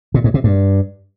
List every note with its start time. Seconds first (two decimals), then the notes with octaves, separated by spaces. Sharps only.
0.14 A#2
0.24 G#2
0.34 C3
0.44 G2